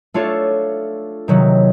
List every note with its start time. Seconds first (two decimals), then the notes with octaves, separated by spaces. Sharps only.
0.14 A3 D4 F4 A4 C#5
1.28 C3 D#3 F#3